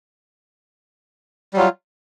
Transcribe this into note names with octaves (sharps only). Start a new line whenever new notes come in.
F#3 G3 F4